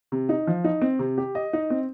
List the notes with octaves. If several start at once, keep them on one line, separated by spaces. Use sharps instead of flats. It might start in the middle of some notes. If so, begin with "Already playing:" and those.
C3
D#4
F3
D#4
C4
C3
G4
D#5
D#4
C4